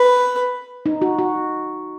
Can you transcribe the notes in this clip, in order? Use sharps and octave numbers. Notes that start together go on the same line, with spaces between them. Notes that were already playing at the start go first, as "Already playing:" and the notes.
Already playing: B4
D#4
F#4
F#4